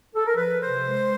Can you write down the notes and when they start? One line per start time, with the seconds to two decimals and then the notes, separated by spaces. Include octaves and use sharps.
0.16 A4
0.27 A#4
0.37 F3 B4
0.61 C3 C5
0.86 G#3